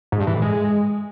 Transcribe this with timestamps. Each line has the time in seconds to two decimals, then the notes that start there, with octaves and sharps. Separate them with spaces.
0.12 G#2
0.20 G2
0.27 E3
0.35 A2
0.42 G#3